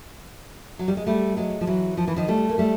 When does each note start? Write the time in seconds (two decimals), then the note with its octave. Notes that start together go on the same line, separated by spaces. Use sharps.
0.79 F#3
0.88 G3
0.97 G#3
1.06 G3 A3
1.37 F#3 G#3
1.61 F3
1.67 E3 F#3
1.97 F3
2.08 E3
2.16 D#3 F3
2.28 G3 A3
2.49 A#3
2.58 G3 A3